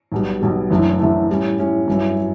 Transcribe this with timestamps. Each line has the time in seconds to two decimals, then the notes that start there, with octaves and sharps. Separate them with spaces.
0.12 B1 B2 G3
0.41 B1 B2 G3
0.70 F#1 F#2 E3 A3 D4
0.99 F#1 F#2 E3 A3 D4
1.29 A2 G3 C#4
1.58 A2 G3 C#4
1.88 G2 F#3 C#4 E4
2.18 F#3